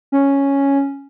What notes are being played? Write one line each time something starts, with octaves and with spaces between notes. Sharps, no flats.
C#4